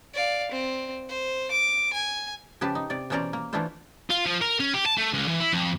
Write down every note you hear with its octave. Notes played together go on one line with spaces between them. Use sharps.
D5 F5
C4
C5
D6
G#5
C#3 F3 G4 B4 A5
D#4
C3 D5
B2 E3 C#4 C5 D5 A#5
A#3
E3 A3 D4 E4 F4 C5
F4
F3
A#4
C#4
G4
A5
A3
C#2
E3
E4
F2